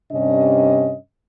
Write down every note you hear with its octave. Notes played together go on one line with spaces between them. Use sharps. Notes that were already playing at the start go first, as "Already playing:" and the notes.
G2 C3 C#4 D4 D#5